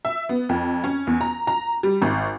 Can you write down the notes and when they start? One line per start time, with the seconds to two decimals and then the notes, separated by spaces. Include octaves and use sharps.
0.05 E5
0.29 B3
0.49 F2
0.84 C#4
1.07 E2
1.21 A#5
1.47 A#5
1.83 G3
2.02 G#1